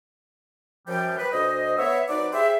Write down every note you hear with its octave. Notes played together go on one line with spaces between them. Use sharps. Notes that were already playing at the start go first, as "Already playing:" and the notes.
F#2 F3 G3 G5
B4
D2 C5 D#5
B3 C#5 E5
F#3 C4 D#4 B4 D5
G4 G#4 C5 E5